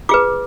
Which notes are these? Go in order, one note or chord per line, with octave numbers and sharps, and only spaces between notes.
F4 G#4 B4 D6